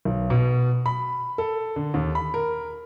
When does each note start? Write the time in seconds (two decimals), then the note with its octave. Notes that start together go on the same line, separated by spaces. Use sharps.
0.05 B1
0.30 B2
0.86 B5
1.38 A4
1.76 D3
1.94 D#2
2.15 B5
2.34 A#4